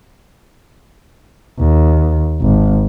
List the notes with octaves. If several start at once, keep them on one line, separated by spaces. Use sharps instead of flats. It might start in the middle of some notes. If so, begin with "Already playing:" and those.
D#2
G#1